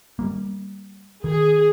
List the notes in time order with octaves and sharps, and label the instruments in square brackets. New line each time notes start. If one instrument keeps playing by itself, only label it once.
[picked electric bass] G3 A3 A#3
[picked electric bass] D#3 [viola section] G#4